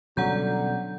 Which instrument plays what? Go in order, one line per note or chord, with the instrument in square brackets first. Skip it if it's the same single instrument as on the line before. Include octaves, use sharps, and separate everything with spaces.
[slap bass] B2 G3 C#4 [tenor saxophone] D3 [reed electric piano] F#3 [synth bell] F#5 A#5 G6